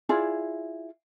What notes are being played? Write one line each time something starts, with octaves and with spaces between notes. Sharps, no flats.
E4 F4 G#4 D5